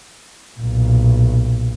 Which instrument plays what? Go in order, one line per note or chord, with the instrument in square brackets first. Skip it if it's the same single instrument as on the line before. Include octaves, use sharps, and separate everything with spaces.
[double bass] B1 A#2